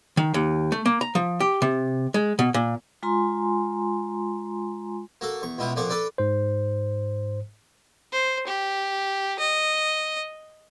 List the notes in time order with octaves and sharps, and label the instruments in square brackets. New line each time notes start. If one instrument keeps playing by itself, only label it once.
[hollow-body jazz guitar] D#3
D#2
A3
A#3
A#5
F3
G4
C3
G#3
B2
A#2
[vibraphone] G#3 F4 G#5 A#5 C6
[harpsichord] A#3 F#4 A4
E2 C#6
C#2 B2 E4 F4 F#5
F2 A#2 F3 D5 F#5 C#6
D4 A4 B4 D5
[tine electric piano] G#2 C5
[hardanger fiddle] C5
G4
D#5